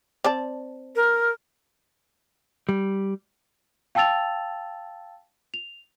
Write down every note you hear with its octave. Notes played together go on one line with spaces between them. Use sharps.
C4 D5 A5
A#4
G3
F5 G5 A5 E6 A6 F7
F7